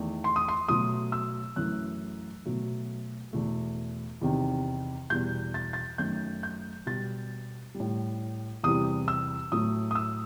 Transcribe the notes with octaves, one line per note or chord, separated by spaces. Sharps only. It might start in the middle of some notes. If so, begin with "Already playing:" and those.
Already playing: E2 D#3 A3
C6
D#6
C6
B2 F#3 A3 D#6
E6
F#2 E3 A3 F#6
B2 F#3 A3
E2 B2 A3
E2 C3 D#3
E2 B2 G3 G6
A6
A6
F#2 D#3 A3 G6
G6
B2 G3 A6
G3
A2
E2 C3 E3 G3 D#6
E6
A2 F#3 A3 D#6
D#6
E6